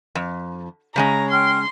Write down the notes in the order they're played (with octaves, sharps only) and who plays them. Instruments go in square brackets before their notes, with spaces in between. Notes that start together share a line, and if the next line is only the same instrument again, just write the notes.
[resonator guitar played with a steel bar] F2
[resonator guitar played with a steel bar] C#3 G#3 C#4 [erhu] A#5
[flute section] G5 F6 [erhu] C6